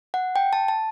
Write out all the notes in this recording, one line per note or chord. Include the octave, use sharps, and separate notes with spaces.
F#5
G5
A5
A5